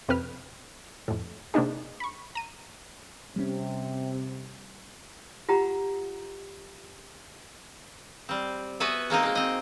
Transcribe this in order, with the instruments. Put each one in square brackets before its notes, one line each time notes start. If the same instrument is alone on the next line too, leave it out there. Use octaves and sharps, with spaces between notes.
[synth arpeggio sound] F2 C3 C4 B4 F6
F2 A2
C3 A#3 D4 D#4 G#4
B5 C#6
A#5 D#7
[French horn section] C3 [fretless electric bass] G3 G#3 C#4
[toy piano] F4 G4 F#5 A#5 B5
[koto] G3 C4
B3 F#4 B4 E5 G#5
G#3 A#3 C4 D#4
G#3 A#3
C4 D#5